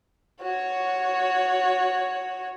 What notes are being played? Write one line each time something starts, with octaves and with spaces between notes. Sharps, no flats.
F#4 C#5